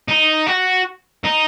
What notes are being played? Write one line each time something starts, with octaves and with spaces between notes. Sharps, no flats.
D#4
F#4
D#4